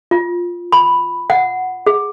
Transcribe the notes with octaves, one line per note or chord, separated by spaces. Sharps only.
F4
B5
F#5
G#4